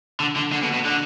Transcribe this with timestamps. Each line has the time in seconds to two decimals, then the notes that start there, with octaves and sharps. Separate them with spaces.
0.20 D3
0.36 D3
0.53 D3
0.63 B2
0.74 B2
0.86 D3